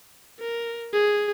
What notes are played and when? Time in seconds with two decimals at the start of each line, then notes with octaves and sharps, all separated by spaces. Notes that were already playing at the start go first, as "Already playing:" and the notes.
0.40 A#4
0.93 G#4